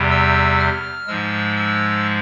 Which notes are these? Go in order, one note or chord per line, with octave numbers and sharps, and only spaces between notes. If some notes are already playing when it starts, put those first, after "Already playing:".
Already playing: E2 C3 G3
E6
F6
G#2 F3 G#3 E6
E6